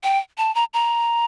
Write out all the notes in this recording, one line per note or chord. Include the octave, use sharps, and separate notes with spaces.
G5
A5
A#5
A#5